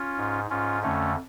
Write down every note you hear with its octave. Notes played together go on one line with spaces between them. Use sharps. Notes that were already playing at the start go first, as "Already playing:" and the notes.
Already playing: C#4 F4
G#2
G#2 C#4 F4
F2 D3 A3 C#4